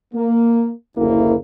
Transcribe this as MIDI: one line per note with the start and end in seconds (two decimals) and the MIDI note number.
0.14 0.70 58
0.97 1.35 30
0.97 1.35 38
0.97 1.35 58
0.97 1.35 64